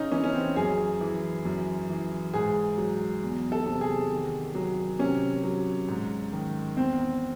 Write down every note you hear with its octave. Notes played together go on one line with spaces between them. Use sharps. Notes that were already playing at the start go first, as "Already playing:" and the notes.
Already playing: C#3 C#4 D#4
E3 C#4
C#4
C4
F#2 G#4
E3
F#2
E3
G#2 G#4
F#3
E2
A4
C3
G#4
D#3
F#3
C3 C#4
F#3
G#2
D#3
E2 C4